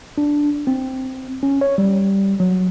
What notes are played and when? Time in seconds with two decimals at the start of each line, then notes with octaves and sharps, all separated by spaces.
0.18 D4
0.67 C4
1.43 C#4
1.61 C#5
1.78 G3
2.40 F#3